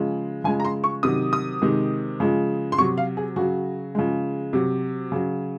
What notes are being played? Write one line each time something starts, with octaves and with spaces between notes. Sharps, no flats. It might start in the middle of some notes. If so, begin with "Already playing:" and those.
Already playing: C#3 F3 G#3
C#3 F3 G#3 G#5
A#5
C6
C#6
C3 D#3 F#3 D#6
D#6
C3 D#3 G#3
C#3 F3 G#3
C6
C3 F#3 C#6
F5
G#4
C#3 F#4
F#3
C#3 F3 G#3
C3 F#3
C#3 F#3